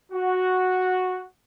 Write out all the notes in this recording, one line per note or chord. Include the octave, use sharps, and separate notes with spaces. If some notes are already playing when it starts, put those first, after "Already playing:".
F#4